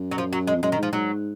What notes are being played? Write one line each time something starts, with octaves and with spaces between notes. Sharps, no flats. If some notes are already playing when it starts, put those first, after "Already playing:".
Already playing: F#2
F#3
F3
F#3
G#3
F2
F#2 G#3
D#3
G#2
F3
G#2 F#3